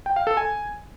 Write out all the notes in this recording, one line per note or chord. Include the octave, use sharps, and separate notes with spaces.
G5
F5
A4
G#5